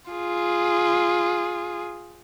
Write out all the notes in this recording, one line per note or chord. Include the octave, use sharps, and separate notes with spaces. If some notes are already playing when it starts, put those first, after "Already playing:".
F4 G#4